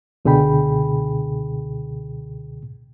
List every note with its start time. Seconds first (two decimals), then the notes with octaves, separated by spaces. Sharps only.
0.25 C#2 B2 D3 G#4 G5 B5